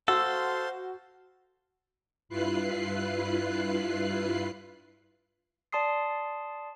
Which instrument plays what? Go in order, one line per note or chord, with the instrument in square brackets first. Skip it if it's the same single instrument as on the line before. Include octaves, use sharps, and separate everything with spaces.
[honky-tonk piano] F#4 [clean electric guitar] A4 [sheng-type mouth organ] C5 F5 C6 [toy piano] E6
[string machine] G2 E4 F4 B4 F#6 C7
[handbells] D5 A5 C6 D#6 C7